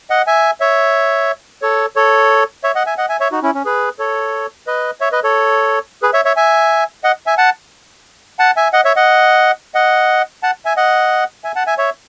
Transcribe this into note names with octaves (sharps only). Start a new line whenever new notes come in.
D#5 F#5
E5 G#5
C#5 E5
A4 C#5
A4 C#5
C#5 E5
D#5 F#5
E5 G#5
D#5 F#5
E5 G#5
C#5 E5
D#4 F#4
C#4 E4
C#4
G#4 B4
A4 C#5
B4 D#5
C#5 E5
B4 D#5
A4 C#5
G#4 B4
C#5 E5
C#5 E5
E5 G#5
D#5 F#5
E5 G#5
F#5 A5
F#5 A5
E5 G#5
D#5 F#5
C#5 E5
D#5 F#5
D#5 F#5
F#5 A5
E5 G#5
D#5 F#5
E5 G#5
F#5 A5
E5 G#5
C#5 E5